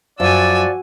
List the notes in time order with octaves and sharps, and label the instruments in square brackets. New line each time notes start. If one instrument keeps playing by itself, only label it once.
[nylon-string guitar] F#2 [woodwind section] F3 D5 [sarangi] F#4 [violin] G#5 E6